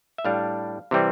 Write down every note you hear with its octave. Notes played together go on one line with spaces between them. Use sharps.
E5
A2 G3 D4 F5
C3 E3 G3 C4